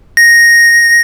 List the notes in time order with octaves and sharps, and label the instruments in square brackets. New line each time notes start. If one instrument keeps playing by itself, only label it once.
[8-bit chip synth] A#6